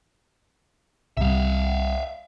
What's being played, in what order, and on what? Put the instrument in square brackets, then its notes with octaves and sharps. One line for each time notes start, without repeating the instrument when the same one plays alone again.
[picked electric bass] C2 C3 G3 [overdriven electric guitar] E5 F5